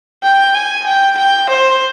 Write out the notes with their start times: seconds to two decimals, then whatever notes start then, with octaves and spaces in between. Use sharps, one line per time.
0.23 G5
0.54 G#5
0.86 G5
1.17 G5
1.50 C5